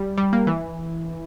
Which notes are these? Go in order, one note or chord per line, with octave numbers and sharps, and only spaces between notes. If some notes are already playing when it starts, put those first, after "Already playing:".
Already playing: G3
G3
A#3
E3